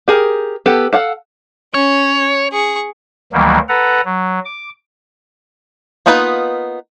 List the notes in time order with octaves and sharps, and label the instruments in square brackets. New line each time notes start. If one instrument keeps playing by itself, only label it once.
[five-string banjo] G4 G#4 A#4
B3 G4 A4
A4 F5 F#5
[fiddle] C#4 [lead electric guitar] C#5
[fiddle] G#4 C#6
[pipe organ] D2 D#3 E3 F#3 G3 A#3
A4 B4 F#5 A#5
F#3
D6
[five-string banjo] A#3 B3 D#4 F4 B4